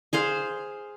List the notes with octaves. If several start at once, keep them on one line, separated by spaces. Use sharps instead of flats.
G#4 C5 F5